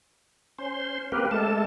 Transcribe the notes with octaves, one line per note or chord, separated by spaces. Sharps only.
C#4 C5 C6
A#3 C4 G4 A#4 B4
G#3 A3 A4 A5